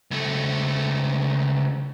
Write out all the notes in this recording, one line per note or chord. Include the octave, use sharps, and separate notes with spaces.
C#2 A3